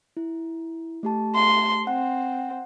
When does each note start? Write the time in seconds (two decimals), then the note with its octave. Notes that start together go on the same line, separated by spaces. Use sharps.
0.17 E4
1.03 A3 G4 A5
1.35 C6
1.87 C4 F#5